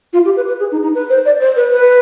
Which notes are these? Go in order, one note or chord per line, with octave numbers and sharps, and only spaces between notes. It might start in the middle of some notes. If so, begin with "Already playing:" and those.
F4
G4
B4
B4
G#4
D#4
D#4
B4
C5
D5
C5
B4
B4